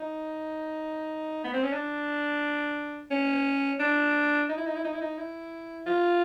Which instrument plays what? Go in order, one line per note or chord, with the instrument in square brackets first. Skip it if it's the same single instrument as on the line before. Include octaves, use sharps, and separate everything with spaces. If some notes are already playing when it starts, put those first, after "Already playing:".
Already playing: [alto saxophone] D#4
B3
C4
C#4
D4
C#4
D4
D#4
E4
D#4
E4
D#4
E4
D#4
E4
F4